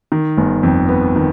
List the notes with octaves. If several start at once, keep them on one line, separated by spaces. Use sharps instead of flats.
D#3
G1
F2
B3
D#3